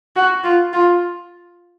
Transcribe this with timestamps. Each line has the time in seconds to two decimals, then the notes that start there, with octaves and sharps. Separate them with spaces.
0.16 F#4
0.44 F4
0.73 F4